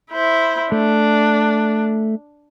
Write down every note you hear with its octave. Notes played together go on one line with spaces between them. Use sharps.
E4 C5
A3 D4